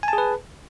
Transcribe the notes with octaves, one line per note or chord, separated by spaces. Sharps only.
G#4 B4 G#5 A5